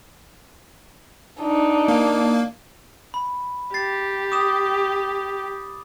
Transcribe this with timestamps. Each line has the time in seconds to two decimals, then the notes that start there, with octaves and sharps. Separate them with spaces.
1.41 D4 D#4
1.88 A#3
3.14 B5
3.74 G4 A6 C7
4.32 D6 D#6 E7